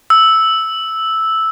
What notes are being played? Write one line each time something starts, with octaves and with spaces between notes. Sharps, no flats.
E6